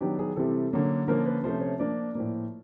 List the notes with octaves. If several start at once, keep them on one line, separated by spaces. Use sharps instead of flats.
D#3 F#3 B3 D4 G4
G#4
C3 E3 G3 C4 A4
D3 F#3 A#3 C#4
D3 F3 A#3 C#4 A#4
B4
C3 F3 A3 C#4 C5
C#5
F3 A#3 D4 D5
A2 F3 A#3